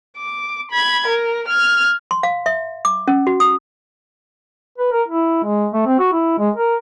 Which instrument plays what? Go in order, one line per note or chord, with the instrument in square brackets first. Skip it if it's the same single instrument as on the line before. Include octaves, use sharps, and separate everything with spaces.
[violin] D6
B5 G#6
A#4
F6 G#6
[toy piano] C6
F5
E5
D6
C#4
F#4
D#6
[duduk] B4
A#4
E4
G#3
A3
C4
F#4
E4
G#3
A#4